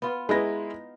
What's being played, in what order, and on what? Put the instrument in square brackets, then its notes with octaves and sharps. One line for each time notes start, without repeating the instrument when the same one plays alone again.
[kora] B3 F4
[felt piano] G#3 E4 A#6 [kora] B3 D#4